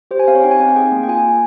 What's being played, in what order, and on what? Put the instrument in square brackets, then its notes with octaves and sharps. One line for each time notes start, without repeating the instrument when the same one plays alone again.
[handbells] G4 C5
G#5
C4 F5
C#5
D#4 G5
G#5
C4 G5
F5
G#4 G5
A#3
G5
F4 G#5
A#3